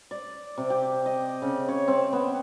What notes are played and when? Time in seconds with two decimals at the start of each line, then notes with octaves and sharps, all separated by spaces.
0.11 D5
0.58 C3
0.70 G4
1.06 D#5
1.42 C#3
1.69 C#5
1.88 C4
2.13 B3